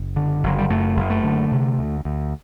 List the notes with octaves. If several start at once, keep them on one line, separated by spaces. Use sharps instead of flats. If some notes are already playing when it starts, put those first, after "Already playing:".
Already playing: F#1
D3
F#1 F#3
G3
F#2 A3
F#1
A3
D3
C3
D2
D2